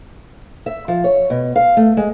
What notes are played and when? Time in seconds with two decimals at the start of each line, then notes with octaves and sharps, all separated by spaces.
0.66 E5
0.88 F3
1.04 C#5
1.30 B2
1.56 F5
1.77 A3
1.97 G#3